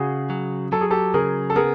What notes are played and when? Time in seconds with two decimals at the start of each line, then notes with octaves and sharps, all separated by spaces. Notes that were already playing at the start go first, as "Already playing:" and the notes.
Already playing: C#3 F#4 G#4
0.30 F#3
0.72 F#3 A4
0.81 G#4
0.90 G4 A4
1.14 C#3 G#4 A#4
1.50 A4
1.55 B3 G#4 A#4